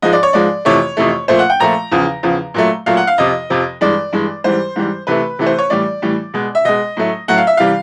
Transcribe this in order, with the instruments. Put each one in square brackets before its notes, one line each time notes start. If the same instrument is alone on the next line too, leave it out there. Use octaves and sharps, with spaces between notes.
[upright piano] G#2 F3 G#3 D#5
D5
C#5
G#2 F3 G#3 D5
F2 C3 E3 A3 C#5
F2 C3 E3 A3
A#2 F3 A3 C5
F#5
G5
A#2 F3 A3 A#5
E2 C#3 F3
E2 C#3 F3
A#2 F#3 A3
A#2 F#3 A3 F5
F#5
F5
F2 C3 F3 D#5
F2 C3 F3
G2 E3 G#3 D5
G2 E3 G#3
G#2 E3 G3 C5
G#2 E3 G3
C3 E3 A3 B4
C3 E3 A3
C5
C#5
A2 E3 G3 D5
A2 E3 G3
B2 G#3
E5
B2 G#3 D#5
A2 F#3 A3
A2 F#3 A3 F#5
F5
E5
C3 E3 G3 F5